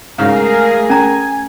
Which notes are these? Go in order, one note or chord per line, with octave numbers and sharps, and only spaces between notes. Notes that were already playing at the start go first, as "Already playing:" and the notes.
G#2 C#3 A3 G#4 A#4 F5
C#4 G#5 A#5